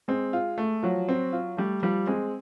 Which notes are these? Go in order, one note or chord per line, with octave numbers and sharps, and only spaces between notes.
G#3 C4
F4
A3
F3 F#3
C4
F4
G3 A3
F3 G3
G#3 C4